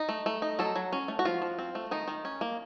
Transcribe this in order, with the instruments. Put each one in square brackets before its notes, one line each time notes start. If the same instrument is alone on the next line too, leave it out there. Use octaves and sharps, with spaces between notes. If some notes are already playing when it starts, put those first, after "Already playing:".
Already playing: [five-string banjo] D#4
A3
A3
D#4
F#3 A4
F#3
C#4
A3
F#4
F3 F4
F3
C4
A3
D#3 D#4
D#3
C#4
A#3